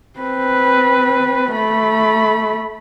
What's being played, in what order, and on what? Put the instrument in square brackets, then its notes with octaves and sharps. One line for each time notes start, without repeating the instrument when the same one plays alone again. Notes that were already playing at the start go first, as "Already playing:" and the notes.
[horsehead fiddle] C4 B4
A3 B5